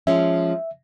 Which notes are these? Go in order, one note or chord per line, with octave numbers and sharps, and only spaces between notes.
F3 G#3 C#4 E5